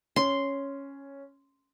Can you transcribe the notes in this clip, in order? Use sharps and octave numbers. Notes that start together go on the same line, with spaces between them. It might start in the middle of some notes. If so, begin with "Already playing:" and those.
C#4 C6